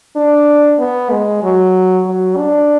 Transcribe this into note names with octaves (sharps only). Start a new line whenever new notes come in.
D4
B3
G#3
F#3
F#3
D4